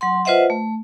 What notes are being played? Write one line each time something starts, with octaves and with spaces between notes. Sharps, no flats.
F#3 F#5 C6
F4 B4 C5 D#5 E5 F#5
A3